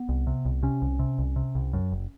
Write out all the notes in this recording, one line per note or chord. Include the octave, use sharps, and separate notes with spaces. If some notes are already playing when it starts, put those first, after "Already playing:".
Already playing: B3
C2
C3
C2
C3 C#4
C2
C3
C2
C3
C2
F#2
F#1